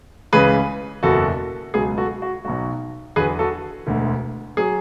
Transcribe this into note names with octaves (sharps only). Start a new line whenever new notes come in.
C#2 C#3 E3 G#4 B4
F#1 E2 B2 F#4 A4
C#2 B2 F#3 G#4
F#4 A4
F#4
B1 B2 F#3 F#4
E2 D3 F#3 G#4 B4
F#4 A4
E1 D2 D3
F#3 G#4